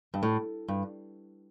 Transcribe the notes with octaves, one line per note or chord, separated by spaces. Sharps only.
G2
A2
G2